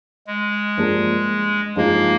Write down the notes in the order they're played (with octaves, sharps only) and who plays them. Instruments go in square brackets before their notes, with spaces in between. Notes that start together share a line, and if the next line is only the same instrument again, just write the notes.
[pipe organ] G#3
[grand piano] G2 F3 A#3 D4 G#4
[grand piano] G2 F3 G#3 D#4 G#4 [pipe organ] A#3